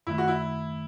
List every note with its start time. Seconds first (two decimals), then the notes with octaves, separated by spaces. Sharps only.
0.07 F#2 D#3 A3 E4
0.18 F#4
0.28 E4